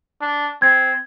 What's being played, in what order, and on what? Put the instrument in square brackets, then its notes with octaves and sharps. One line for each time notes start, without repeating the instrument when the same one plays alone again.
[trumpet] D4
[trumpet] C4 [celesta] G#6